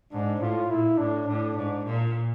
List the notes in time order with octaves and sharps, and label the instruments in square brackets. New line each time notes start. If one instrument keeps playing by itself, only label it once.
[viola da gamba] G#2 [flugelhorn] D4
[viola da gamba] A2 [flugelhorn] F4
[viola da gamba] A#2 [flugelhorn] E4
[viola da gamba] A2 [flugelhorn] D4
[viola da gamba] A2 [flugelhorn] D4
[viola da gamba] G#2 [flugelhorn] D4
[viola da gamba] A#2